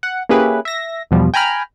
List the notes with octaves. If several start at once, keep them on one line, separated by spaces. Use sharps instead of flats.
F#5
A#3 C#4 E4 G4 G#4 B4
E5 A#6
E2 B2 F3 G3
G5 G#5 A#5 B5 F6